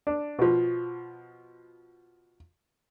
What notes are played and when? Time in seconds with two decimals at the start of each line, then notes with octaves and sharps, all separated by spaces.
0.07 D4
0.39 B2 F3